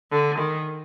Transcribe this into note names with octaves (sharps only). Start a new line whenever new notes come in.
D3
D#3